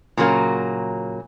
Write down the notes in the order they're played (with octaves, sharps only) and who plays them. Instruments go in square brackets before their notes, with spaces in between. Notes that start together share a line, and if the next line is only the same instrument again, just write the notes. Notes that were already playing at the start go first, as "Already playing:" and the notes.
[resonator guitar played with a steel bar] A#2 C#3 F#3 A#3